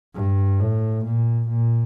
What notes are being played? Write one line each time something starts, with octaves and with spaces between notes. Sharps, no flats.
G2
A2
A#2
A#2